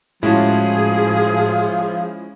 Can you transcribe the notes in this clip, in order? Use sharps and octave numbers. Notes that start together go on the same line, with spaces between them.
A2 F3 G#3 C#4 E4 F#4 G#4 A5